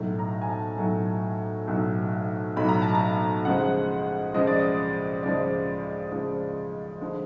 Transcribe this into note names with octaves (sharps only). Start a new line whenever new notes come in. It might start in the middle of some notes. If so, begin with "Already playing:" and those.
Already playing: B1 A2 F#3
A#5
G#5
A5
B1 A2 F#3
B1 A2 F#3
B1 A2 F#3 B5
A#5
A5
A#5
C#2 C#3 F3 G#3 F#5
C#2 C#3 F3 G#3 D#5
D5
D#5
C#2 C#3 F3 G#3 D5
C#2 C#3 F3 G#3
D3 F3 G#3